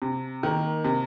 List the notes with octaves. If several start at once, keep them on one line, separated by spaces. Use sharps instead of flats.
C3
D#3 A#3
C3